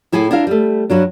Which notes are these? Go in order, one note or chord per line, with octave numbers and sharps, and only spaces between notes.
A2 E4 G#4 A4 G#5
D4 E4 A#4 F5
G3 A3
G2 F#3 D4